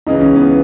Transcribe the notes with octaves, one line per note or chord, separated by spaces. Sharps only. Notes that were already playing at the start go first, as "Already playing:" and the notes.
C#2 C#3 E3 D#4
C#4
B3